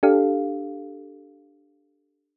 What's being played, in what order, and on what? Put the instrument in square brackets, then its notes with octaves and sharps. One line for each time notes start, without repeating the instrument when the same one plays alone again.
[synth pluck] D4 G4 A4 F5